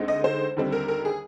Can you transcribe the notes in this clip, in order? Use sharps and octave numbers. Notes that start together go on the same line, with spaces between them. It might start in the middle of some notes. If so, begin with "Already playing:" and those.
Already playing: D2 D3 G#3 C4 D#4
D#5
C5
D#2 D3 G3 C4
A#4
A#4
G#4